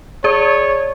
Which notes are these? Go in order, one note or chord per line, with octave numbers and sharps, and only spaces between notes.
G#4 C#5 D5